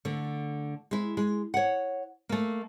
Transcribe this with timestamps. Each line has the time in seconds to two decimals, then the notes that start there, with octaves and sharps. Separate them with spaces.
0.05 D3 A3
0.91 G#3 E4
1.17 G#3
1.54 C#5 F#5
2.29 A3 A#3